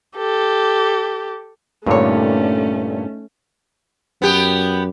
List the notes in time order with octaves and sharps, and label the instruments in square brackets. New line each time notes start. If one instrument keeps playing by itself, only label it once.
[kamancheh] G4 A4
[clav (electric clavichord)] G2 A#2 D3 [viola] A3 C#4 [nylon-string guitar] D#4 C#5
[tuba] F#2 [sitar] B3 G4